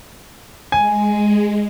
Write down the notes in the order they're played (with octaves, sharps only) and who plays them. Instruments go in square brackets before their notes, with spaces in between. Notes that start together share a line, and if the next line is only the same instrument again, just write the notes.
[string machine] G#3 [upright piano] G#5